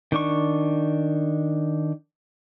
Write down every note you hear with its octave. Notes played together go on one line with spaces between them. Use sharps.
D#3 D4 C#6